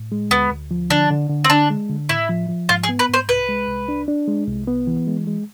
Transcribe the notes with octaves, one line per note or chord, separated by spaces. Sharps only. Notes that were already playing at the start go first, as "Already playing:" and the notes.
Already playing: A2
G#3
D2 B3
D2
F3
D3 D4
D3
D3
C4
D3 D4
G#3
D3
A2 E4
F3
F3
G#2 F4
G#4
B3
B4
G#2 C5
C2 B4
G#3
C2
D4
D4
G#3
C2
B3
E3
G#3
G#3